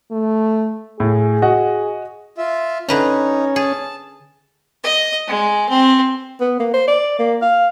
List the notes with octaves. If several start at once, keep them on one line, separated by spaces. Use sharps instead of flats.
A3
A2 G#4
F#4 D#5 F#5
F4 E5
D3 C#4 D#4 B4 A#5
G#4 A5
D#5
G#3
C4
B3
A#3
C5
D5
A#3
F5